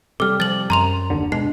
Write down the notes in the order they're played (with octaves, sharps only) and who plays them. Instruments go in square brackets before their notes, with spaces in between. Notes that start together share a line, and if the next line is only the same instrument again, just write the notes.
[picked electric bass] C3 G3 [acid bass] A4 [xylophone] D6 F6
[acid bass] F3 [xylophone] A6 F#7
[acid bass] F#2 [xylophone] A#5 C6 F7
[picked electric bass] F1 D#2 D3
[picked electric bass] B2 G#3 [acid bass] D4 [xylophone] C7